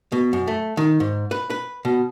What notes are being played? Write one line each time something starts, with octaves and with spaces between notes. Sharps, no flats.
B2
F#2
A3
D#3
G#2
B4
B4
B2